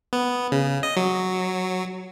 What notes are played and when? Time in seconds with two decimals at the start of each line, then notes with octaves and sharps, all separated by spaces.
0.13 B3
0.52 C#3
0.83 D#5
0.96 F#3